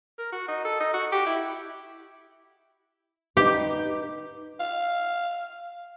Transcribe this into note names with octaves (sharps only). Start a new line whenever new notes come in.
A#4
F#4
D#4
A4
D#4
F#4
G4
E4
D#4 G4 B4
F5